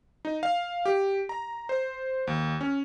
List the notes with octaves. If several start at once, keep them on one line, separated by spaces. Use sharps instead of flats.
D#4
F5
G4
A#5
C5
D#2
C#4